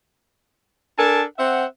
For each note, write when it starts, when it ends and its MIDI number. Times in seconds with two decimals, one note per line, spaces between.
0.98 1.22 62
0.98 1.22 69
0.98 1.22 70
0.98 1.22 80
0.98 1.22 81
1.38 1.65 60
1.38 1.65 76
1.38 1.65 78